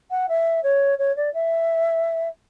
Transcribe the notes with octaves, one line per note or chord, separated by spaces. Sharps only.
F#5
E5
C#5
C#5
D5
E5